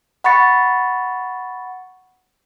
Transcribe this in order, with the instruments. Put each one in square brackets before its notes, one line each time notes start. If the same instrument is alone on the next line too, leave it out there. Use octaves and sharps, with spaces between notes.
[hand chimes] F#5 B5 C#6 A6 C#7